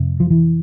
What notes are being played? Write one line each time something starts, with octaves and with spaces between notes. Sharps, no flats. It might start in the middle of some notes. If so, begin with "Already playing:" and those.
Already playing: F2 C3
F3
E3